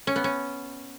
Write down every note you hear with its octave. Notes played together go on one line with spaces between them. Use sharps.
C#4
B3
C#4